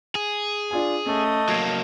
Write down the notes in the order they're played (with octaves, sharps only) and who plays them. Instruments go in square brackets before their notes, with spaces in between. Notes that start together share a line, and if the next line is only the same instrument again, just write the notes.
[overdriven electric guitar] G#4
[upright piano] D4 F4 G#5
[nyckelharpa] A3 D#5 [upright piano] C#4
[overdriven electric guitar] F#3 A#3 [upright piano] G#6 C7 D7